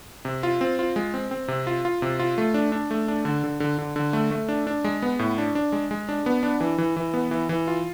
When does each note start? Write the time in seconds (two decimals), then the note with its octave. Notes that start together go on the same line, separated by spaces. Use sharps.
0.25 C3
0.43 F4
0.61 C4
0.79 F4
0.96 G#3
1.14 C4
1.31 C4
1.48 C3
1.67 F4
1.85 F4
2.02 C3
2.19 F4
2.38 A3
2.54 D4
2.72 D4
2.91 A3
3.08 D4
3.25 D3
3.44 D3
3.60 D3
3.78 D3
3.96 D3
4.13 A3
4.31 A3
4.49 D4
4.67 D4
4.84 G#3
5.02 B3
5.19 A2
5.38 D4
5.55 D4
5.72 G#3
5.91 G#3
6.09 D4
6.26 B3
6.43 D4
6.60 E3
6.78 E3
6.97 E3
7.14 B3
7.31 E3
7.49 E3
7.68 F4